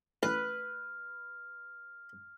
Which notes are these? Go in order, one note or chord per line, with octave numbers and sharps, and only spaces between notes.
A1 B4 F6